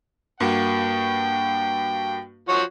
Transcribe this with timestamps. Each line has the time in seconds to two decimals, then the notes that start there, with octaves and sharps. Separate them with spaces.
0.40 G2 A#3 F#4 G5
2.49 F3 F#4 C#5